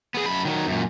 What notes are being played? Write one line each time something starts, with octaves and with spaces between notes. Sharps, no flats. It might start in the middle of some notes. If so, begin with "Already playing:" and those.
B3 G#4
F#2 B5
D#3 F#3
F#2 A#2